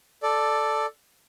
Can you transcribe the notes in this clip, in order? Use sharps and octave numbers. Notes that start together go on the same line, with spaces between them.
A4 D5